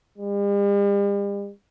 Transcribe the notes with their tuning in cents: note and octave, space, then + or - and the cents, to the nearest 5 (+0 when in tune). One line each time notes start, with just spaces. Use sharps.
G3 +45